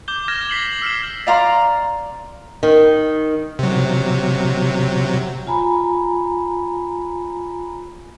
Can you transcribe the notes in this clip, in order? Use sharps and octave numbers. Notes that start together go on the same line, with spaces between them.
D6 G6 G7
F6 G#6 A#6 E7
B6 C7 F#7
E6 F6 C7 E7
D5 F5 A#5 C6
D#3
C3 F#3
F4 G#5 A#5 B5